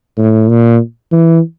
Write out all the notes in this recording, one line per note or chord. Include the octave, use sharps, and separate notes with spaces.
A2
A#2
E3